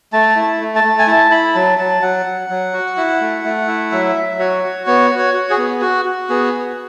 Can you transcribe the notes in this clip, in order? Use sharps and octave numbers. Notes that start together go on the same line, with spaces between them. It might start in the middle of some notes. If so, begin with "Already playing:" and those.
A3 A5
E4
A3
A5
A3
G#5
E4 A5
E4 B5
F#3 A5
F#3 A5
F#3 F#5
F#3
F#3
F#4
E4
A3
A3
E4
F#3 E5
F#3
F#4 C#5
F#4
B3 C#5
F#4
C#5
F#4
G#4
B3
F#4
F#4
B3 G#4
F#4